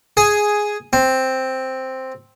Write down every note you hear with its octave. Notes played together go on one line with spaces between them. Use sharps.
G#4
C4